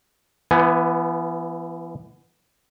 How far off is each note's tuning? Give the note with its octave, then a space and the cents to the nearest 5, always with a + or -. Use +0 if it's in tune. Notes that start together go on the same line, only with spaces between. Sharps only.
E3 +35 B3 +0 G#5 +0